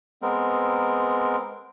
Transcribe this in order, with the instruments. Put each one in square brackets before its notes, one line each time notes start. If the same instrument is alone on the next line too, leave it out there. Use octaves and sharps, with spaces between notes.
[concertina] G#3 B3 C4 A#4